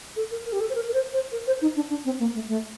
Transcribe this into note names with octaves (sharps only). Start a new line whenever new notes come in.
A4
A#4
A#4
G4
A4
C5
A#4
A#4
C5
C5
A#4
C5
D#4
D4
D4
C4
A#3
A3
A3